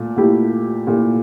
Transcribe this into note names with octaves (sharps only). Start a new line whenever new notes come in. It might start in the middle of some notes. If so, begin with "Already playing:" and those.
Already playing: A#2 A3
A#2 A3 E4 G4
A#2 A3 E4 G4